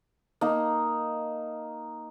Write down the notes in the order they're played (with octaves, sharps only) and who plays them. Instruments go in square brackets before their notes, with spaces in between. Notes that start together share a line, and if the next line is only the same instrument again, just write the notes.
[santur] A#3 D#4